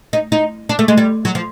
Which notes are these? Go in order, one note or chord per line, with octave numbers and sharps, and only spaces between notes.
D#4
D#4
D4
A3
G#3
G3
F#3
F3